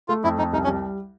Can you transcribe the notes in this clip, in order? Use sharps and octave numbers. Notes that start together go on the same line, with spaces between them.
A3 F4
F2 E4
F2 D#4
C2 D#4
C#4
G3